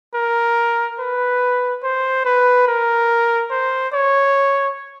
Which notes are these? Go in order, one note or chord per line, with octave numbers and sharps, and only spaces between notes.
A#4
B4
C5
B4
A#4
C5
C#5